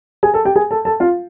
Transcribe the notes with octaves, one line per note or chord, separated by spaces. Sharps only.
G#4 G#5
A4 A5
G4 G5
G#4 G#5
A4 A5
A4 A5
F4 F5